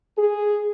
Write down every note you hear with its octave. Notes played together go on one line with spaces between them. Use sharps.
G#4